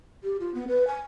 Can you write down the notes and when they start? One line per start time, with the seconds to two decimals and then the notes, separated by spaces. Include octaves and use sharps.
0.23 G4
0.40 F4
0.54 B3
0.68 B4
0.87 G#5